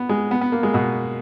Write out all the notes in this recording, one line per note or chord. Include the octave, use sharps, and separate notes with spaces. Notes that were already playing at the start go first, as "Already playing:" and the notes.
Already playing: B3
G#3
B3
B3
A#3
G#3
B2